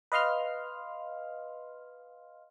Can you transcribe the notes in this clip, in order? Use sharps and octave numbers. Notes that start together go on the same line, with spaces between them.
B4 D#5 F5 C6 F6